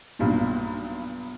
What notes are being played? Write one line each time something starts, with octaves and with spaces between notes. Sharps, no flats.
B1 G2 A#2